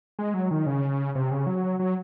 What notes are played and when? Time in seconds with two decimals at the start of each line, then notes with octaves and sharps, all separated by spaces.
0.19 G#3
0.34 F#3
0.51 D#3
0.66 C#3
1.15 C3
1.31 C#3
1.47 F#3
1.79 F#3